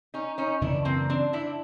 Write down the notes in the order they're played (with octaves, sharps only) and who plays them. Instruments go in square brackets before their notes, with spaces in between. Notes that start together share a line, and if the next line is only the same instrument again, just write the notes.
[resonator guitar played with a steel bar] C#4 D#4
C#4 D#4
[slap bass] F#2 C#3 E3 [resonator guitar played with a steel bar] D4 E4
[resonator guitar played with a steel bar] A#3 C4
C4 D4
D4 E4